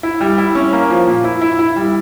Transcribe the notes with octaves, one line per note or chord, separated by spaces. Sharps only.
E4
G3
E4
C#4
A#3
F3
A#2
E4
E4
E4
G3